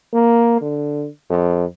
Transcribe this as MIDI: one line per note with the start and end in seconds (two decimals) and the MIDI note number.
0.14 0.58 58
0.61 1.07 50
1.30 1.65 41